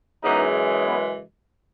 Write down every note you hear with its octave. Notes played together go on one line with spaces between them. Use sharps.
F#2 C#3 E3 G#3 B3 D#4
B3